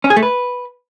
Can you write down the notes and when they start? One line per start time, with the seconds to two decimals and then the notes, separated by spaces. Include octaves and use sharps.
0.04 C#4
0.10 G#4
0.16 A3
0.23 B4